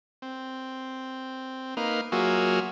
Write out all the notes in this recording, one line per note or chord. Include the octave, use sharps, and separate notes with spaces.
C4
A#3 D#4 B4 F5
F#3 A#3 F4 F#4 G#4 E5